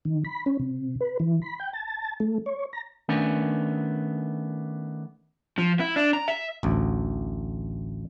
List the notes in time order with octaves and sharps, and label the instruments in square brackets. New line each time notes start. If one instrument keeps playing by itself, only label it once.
[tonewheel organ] D#3
B5
C#4
C3
B4
E3
B5
G5
A5
A3
C#5
A#5
[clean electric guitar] D#3 A3 B3 C#4 D4
[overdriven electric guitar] F3
E4
D4
A#5
E5
[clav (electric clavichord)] A1 D2